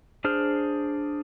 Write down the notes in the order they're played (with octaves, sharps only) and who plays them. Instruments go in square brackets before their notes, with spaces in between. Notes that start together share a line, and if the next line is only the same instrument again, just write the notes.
[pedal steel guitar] D4 G#4 C5 F6